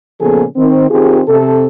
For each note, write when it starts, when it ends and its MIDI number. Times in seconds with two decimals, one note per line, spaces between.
0.20 0.44 46
0.20 0.44 49
0.20 0.44 53
0.20 0.44 59
0.20 0.44 68
0.20 0.44 69
0.56 0.89 51
0.56 0.89 60
0.90 1.20 51
0.90 1.20 60
0.90 1.20 65
0.90 1.20 67
0.90 1.20 68
1.28 1.65 48
1.28 1.65 69